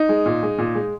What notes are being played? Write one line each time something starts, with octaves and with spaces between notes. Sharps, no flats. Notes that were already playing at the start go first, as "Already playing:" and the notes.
Already playing: D#4
G#3
A#2
G#3
A#2
G#3